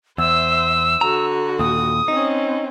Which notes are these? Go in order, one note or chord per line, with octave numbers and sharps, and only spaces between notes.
E2 C5 E5 E6
D3 F#4 A#5
D#2 A#2 D#6
C4 C#4 D#4